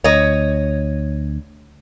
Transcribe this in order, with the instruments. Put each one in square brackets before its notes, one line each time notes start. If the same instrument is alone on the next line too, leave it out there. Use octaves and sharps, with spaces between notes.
[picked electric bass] D2 [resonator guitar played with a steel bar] C#5 D#5